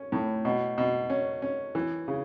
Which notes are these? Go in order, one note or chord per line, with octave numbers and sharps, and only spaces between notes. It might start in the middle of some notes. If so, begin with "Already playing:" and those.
Already playing: C#4
A2
B2
B2
C#4
C#4
E3
C#3